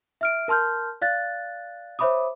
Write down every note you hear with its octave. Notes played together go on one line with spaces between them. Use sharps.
E5 F6 D7
A#4 A5 C6 F6 G6
D5 F5 F#6 A6
C5 C#5 E5 B5 D6 D#6